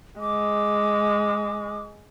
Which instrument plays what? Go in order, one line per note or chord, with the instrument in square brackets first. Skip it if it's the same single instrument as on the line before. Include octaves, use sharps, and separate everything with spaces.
[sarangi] G#3 [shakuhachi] D6